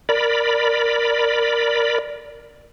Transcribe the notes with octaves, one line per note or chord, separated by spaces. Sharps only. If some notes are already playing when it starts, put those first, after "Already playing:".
A#4 D5 B5